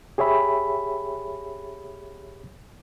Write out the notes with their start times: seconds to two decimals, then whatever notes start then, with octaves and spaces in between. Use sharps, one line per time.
0.18 G4 G#4 C#5 E5 B5